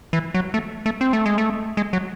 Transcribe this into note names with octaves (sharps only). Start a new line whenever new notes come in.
E3
F#3
A3
A3
C4
A3
G#3
A3
G#3
F#3